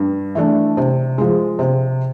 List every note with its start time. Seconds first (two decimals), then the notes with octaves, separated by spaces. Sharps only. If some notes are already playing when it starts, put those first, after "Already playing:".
Already playing: G2
0.35 E3 A3 D4
0.77 C3
1.18 F3 G#3
1.59 C3